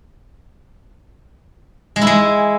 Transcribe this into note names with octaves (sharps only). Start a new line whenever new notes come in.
G#3
E4
G#3